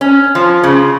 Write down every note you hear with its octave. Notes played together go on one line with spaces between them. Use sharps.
C#4
F3
C#3